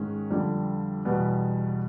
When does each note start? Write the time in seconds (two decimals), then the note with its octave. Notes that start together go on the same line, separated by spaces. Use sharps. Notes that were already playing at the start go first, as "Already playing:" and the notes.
Already playing: G#2 D#3 G#3 C#4
0.30 F2 D3 G3
1.05 E2 B2 G3 B3